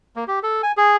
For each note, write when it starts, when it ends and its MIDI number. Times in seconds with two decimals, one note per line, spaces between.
0.16 0.24 58
0.28 0.39 67
0.43 0.62 69
0.63 0.72 80
0.77 0.96 68